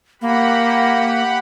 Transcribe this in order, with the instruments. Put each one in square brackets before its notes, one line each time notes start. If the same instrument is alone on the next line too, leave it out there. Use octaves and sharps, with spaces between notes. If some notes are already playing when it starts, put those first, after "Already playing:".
[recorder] A#3 [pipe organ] G4 F#5 B5